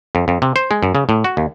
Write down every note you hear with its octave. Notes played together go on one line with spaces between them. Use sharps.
F2
F2
C3
C5
G#3
F#2
C#3
A2
F#4
D#2